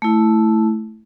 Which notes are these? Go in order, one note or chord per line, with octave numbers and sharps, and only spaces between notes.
A3 E4